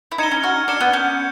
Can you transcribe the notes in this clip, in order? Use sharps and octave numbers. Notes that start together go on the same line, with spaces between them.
E4
D#4 G#6 C#7 E7 G7
C#4
F#4 F6
D4 G#6 C#7 E7 G7
B3
C#4 G6